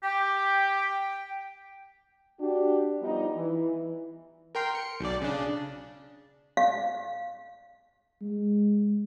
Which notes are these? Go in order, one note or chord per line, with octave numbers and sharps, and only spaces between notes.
G4 G5
D4 F#4 G4
F3 G3 B3 D#4
E3
A#4 G5 C6
C#7
B1 D5
C#3 D4
F5
G#3